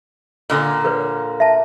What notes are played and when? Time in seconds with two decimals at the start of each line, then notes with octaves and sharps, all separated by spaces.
0.50 A#2 D3 A#3
0.85 A#4 B4 C#5
1.40 E5 A5